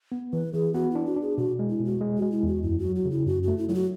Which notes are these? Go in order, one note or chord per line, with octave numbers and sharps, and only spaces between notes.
B3
E3 B4
E3 G#4
B3 F#4
D4 E4
F#4
D4
G#4
B2 F#4
G#3
E4
B2
F#4
G#3
G#3 F#4
E4
E2 F#4
F#2 E4
F#4
F#3
F#4
C#3
E4
F#2 F#4
A3 F#4
E4
F#3 E4
F#4